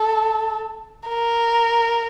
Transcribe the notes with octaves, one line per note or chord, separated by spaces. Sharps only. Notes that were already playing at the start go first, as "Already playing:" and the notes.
Already playing: A4
A#4